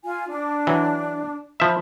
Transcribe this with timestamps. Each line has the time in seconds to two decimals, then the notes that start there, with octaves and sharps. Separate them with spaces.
0.03 F4 G#5
0.28 D4
0.67 E3 F#3
1.60 F3 E5 B5